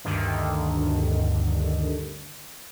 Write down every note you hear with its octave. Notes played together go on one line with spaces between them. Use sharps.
D2 G2 D3 D#3